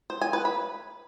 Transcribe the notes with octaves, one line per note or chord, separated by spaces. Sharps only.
C5
G#5
B4
B5